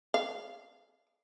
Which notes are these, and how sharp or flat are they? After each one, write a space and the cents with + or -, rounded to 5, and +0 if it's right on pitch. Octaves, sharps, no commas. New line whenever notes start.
F5 -5